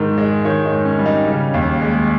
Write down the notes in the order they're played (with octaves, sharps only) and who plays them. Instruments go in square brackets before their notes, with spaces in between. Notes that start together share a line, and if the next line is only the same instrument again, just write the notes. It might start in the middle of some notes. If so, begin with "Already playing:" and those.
Already playing: [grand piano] G#2 D#3
G#3
D#3 C#5
D#4
G#2
C#4
G3
D#4
C#3 C#4
D#2
G#3